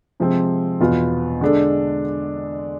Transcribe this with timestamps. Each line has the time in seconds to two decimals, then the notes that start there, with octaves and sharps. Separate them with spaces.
0.20 C3 F3 G#3 C4
0.80 E2 B2 B3 F4
1.41 D3 G#3 D4 A4